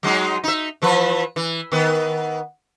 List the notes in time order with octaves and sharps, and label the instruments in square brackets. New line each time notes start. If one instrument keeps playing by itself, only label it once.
[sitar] F#3 G#3 D#4
D#4 E5
E3 F3 B4
E3
D#3 B3